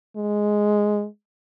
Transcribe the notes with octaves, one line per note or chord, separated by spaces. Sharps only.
G#3